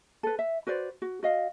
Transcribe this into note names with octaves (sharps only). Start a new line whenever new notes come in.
A4 B4
E5
F#4 B4 C5 D5
F#4
F#4 D#5 F5